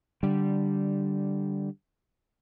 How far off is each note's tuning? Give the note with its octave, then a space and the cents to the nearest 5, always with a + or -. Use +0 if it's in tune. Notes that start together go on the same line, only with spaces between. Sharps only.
D3 +0 G3 -10